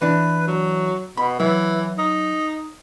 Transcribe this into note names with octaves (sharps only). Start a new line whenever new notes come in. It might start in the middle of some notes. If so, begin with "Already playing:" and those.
E3 D4 B4
F#3
B2 B5
E3 F#3
D#4